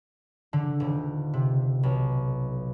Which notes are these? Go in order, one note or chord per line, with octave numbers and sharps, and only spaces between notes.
D3
D#1
C3
B1